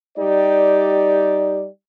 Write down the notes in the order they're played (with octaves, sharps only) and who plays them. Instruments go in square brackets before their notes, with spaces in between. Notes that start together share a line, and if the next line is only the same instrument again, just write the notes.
[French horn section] G3 D#4 G4 D5